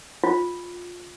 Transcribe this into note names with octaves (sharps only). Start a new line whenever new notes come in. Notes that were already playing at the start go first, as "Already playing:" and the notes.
F4